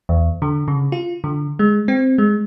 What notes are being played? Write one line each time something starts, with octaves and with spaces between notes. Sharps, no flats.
E2
D3
C#3
F4
D3
G#3
C4
G#3